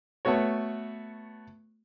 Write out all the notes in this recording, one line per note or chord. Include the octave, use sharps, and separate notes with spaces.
A3 B3 F#4 C#5